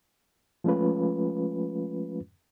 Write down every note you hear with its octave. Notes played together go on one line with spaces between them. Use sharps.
F3 G#3 A3 C#4 F4 B4